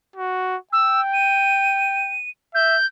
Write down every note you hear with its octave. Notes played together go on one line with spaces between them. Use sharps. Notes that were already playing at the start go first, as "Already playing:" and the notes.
F#4
G5 E6
D#7
E5 G6